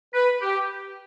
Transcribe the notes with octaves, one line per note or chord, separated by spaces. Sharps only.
B4
G4